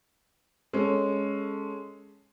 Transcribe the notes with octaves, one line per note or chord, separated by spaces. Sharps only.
G#3 C#4 A4